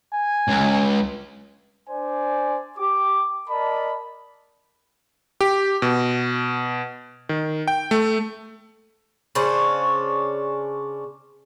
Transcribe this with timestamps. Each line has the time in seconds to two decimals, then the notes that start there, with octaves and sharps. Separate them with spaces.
0.13 G#5
0.48 C#2
1.89 D4 C5 D5 G#5
2.78 G4 D6
3.49 A#4 D5 D#5 A5 B5
5.41 G4
5.82 B2
7.29 D#3
7.68 G5
7.91 A3
9.35 C#3 C#4 D4 C5